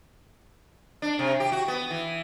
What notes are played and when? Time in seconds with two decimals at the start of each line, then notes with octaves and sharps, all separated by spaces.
1.02 D4
1.19 C3
1.40 G4
1.52 F#4
1.68 B3
1.91 E3